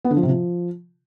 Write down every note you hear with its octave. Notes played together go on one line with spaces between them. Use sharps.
B3
D3
F3
C3
F3